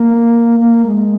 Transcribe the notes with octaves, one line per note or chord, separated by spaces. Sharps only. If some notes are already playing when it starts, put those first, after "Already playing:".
Already playing: A#3
A#3
G#3